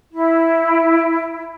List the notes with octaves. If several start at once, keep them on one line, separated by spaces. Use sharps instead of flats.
E4